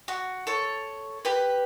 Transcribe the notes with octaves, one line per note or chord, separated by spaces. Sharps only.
F#4
A4 C#5
G4 B4